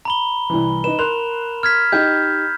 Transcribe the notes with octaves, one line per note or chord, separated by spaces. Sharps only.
A#5 B5 G7
C2 E3
D#4 B4 E7
A#4 C6 F#6 F7
F6 G#6 B6
D#4 G4 G6